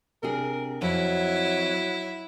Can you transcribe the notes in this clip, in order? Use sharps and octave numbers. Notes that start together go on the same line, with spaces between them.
C3 D4 G#4 A#4
F2 F#3 E4